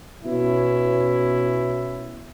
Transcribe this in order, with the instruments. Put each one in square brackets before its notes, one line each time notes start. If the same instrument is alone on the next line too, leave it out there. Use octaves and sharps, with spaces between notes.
[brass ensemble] B2 C#4 E4